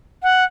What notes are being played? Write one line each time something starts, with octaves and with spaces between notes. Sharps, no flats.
F#5